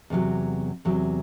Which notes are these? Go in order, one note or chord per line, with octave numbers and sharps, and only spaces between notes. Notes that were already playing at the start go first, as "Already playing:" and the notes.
E2 C3 F#3
E2 C3 F#3